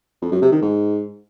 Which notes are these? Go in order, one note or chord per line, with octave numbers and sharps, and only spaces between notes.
F2
F#2
C3
D#3
G#2